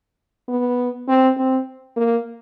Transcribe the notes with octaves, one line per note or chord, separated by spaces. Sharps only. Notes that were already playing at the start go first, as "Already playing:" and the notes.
B3
C4
C4
A#3